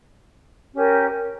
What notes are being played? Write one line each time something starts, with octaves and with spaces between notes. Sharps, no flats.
C#4 G4 A#4